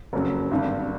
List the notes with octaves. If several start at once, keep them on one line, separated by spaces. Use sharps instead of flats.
F#1 F2 C#3 F#3
G#1 G2 D3